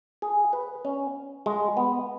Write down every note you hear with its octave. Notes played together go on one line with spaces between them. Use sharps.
G#4
B4
C#4
G#3
B3